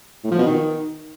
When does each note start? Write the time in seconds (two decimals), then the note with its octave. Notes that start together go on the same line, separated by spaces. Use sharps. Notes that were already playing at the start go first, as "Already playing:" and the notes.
0.24 A2
0.31 F3
0.39 B2
0.46 D#3